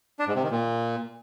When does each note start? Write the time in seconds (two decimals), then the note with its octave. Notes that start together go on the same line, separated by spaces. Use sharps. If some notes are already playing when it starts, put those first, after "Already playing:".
0.19 D4
0.27 G#2
0.35 C3
0.43 D#3
0.51 A#2